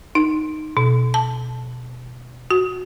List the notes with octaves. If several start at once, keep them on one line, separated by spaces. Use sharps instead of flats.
D#4
B2
A5
F#4